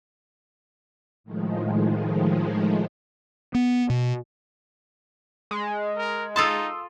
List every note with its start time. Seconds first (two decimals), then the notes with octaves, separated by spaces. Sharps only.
1.24 A2 D#3 F3 G#3
3.54 B3
3.90 B2
5.51 G#3
5.97 A#4
6.36 D#4 F4 A4 A5 C6 D#6 E6